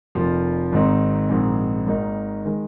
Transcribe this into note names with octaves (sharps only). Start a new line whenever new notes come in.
F1 F2 F3 A#3 F4
G#1 G#2 D#3 C4 D#4
A#1 G#2 D#3 C4
G#1 G#2 D#3 A#3 D#4
D#3 G#3